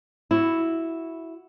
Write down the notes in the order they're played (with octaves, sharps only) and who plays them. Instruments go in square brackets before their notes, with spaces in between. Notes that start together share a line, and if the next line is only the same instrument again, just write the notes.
[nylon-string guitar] E4 F#4